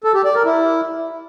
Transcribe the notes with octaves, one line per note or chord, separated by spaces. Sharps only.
A4
G4
D5
A#4
E4